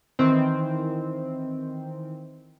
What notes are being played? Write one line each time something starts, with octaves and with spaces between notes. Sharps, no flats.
D#3 E3 C4